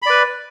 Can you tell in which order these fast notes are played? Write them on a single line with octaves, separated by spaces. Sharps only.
B5 D5 B4